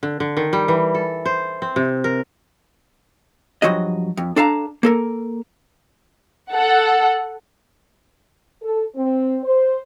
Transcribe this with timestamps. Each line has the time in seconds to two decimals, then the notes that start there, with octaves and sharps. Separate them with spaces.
0.03 D3
0.20 D3
0.37 D#3
0.53 G3
0.68 E3
0.94 A4
1.25 C5
1.62 C4
1.76 C3
2.04 A#4
3.62 G2 F3 F#3 F#4 D#5
4.17 F2
4.36 D4 A4 F5 A5 A#5
4.83 A#3 A4 A#4
6.51 A4 F#5
8.62 A4
8.96 C4
9.43 C5